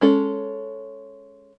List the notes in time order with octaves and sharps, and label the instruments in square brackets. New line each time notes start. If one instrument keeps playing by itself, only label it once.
[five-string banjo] G#3 C#4 A4